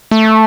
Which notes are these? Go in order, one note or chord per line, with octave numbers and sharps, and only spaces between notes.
A3